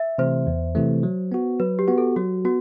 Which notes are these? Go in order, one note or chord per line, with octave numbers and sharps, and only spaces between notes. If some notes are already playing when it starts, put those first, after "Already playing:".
Already playing: E5
C3 E3 A3 C5
E2
C3 E3 A3
F#3
B3 F#4
F#3 B4
G4
B3 F#4
A4
F#3 F#4
B3 F#4